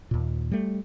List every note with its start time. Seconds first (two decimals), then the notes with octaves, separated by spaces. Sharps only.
0.11 D#2 A#2
0.51 G3 A3